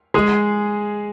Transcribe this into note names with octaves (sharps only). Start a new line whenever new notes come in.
G#3 G#4